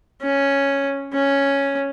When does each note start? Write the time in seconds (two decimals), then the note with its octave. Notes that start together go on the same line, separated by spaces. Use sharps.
0.22 C#4
1.13 C#4